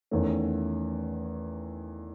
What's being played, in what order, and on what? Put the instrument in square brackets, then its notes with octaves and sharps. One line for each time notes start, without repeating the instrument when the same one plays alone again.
[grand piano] E2 D#3 A3 C#4